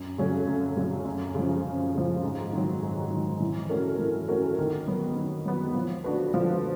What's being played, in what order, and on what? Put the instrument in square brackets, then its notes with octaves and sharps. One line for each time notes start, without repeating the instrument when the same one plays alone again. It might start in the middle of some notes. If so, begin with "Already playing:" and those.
Already playing: [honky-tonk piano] F#2
C#3 F#3 A3 C#4
F#2
C#3 F#3 A3 C#4
F#2
C#3 F3
F#2
C#3 F3
G#2
D#3 F#3
G#2
D#3 F#3
E3
A3 C#4 F#4 A#4
E3
A3 C#4 F#4 A#4
D#3
F#3 B3
D#3
F#3 B3
F3
A3 D4 F#4 B4
F3